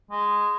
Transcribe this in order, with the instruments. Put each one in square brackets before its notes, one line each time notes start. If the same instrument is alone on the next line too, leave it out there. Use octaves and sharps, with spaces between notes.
[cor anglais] G#3